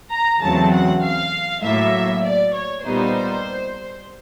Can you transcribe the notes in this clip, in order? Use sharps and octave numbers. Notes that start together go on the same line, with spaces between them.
A#5
E2 C#3 F#3 A3 C4 A5
F#5
F5
A2 F#3 A#3 E5
D5
C#5
A#2 G3 B3 D#4 C5